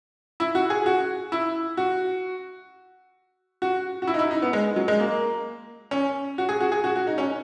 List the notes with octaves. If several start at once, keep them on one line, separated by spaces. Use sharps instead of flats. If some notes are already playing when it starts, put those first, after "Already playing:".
E4
F#4
G#4
F#4
E4
F#4
F#4
F#4
E4
D#4
E4
D#4
B3
G#3
F#3
G#3
A#3
C#4
F#4
G#4
F#4
G#4
F#4
F#4
D#4
C#4